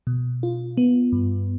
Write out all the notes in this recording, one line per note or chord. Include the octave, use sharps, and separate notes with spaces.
B2
F4
B3
G2